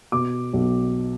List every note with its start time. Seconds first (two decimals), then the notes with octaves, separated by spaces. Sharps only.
0.12 B2 D6
0.53 B1